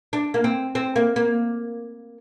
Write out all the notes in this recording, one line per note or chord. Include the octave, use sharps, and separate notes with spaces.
D4
A#3
C4
C4
A#3
A#3